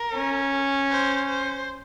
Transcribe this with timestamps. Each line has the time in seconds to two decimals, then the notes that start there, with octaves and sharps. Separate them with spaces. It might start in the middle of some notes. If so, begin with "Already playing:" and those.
Already playing: A#4
0.15 C#4
0.90 C5
1.28 C5